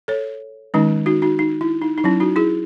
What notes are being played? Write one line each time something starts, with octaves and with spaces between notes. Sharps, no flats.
A4 C#5
D#3 G#3 C#4 D#4
D#4 F#4
D#4 F#4
D#4
E4
D#4
D#4
F#3 C#4 E4
D#4 F#4
E4 G#4